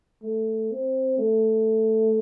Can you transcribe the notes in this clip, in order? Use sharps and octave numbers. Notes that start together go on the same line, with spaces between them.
A3
C4
A3